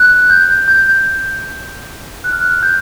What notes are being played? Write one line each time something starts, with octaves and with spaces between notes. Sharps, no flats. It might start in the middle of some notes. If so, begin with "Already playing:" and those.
Already playing: F#6
G6
G6
F#6
F6
F#6
G6